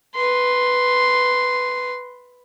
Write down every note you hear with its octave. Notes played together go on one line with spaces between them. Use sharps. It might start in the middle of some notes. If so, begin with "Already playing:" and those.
B4 C6